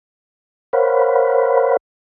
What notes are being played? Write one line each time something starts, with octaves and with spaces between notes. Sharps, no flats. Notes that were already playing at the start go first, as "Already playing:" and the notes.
A#4 C5 C#5 F5 F#5 B5